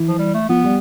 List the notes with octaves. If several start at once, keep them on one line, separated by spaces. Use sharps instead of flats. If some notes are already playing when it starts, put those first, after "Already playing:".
Already playing: E3
F3
G3
A3
F3 B3
G3